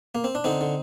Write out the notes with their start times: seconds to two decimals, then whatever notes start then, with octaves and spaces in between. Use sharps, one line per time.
0.15 A#3
0.24 C4
0.35 D4
0.44 D3 C4 D#4
0.61 D3